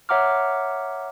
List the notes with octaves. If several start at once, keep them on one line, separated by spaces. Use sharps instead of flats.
C#5 E5 F#5 A#5 D6 F6